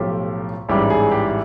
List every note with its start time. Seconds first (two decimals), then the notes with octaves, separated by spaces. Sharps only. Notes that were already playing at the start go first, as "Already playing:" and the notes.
Already playing: B1 A2 F3 G4
0.69 A1 G#2 E3 G3 G4
0.90 G#4
1.11 G4